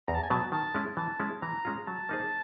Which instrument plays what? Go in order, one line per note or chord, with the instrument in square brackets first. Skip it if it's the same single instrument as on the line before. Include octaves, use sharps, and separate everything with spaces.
[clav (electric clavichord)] E2 [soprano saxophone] A#5
[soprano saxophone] A5
G#5
[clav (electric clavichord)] B2 F#3 B3 [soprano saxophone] A5
[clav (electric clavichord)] D#3 [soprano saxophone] A5
[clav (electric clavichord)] G#3 C#4 E4
[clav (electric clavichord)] E3 [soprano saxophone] A5
[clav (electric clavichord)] G#3 C#4 E4
[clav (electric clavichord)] E3 [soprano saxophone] A#5
[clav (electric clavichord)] G#3 C#4 F4
[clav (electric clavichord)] F#3 [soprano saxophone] A5
[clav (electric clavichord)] A#3 D#4 G#4 C5